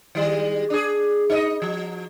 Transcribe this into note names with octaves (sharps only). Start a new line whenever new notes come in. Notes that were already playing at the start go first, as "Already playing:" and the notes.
D#3 G3 G#3
D4 G#4
D#4 D5 D#5
F3